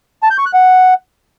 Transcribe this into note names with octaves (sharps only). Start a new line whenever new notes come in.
A5
G6
C#6
F#6
F#5